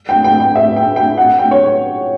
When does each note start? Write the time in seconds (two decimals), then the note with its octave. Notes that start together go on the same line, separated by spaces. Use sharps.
0.09 G5
0.24 G5
0.40 G5
0.56 E5
0.76 G5
0.96 G5
1.18 F#5
1.38 G5
1.51 C#5